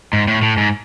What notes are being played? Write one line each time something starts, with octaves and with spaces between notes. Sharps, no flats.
G#2
A2
A2
G#2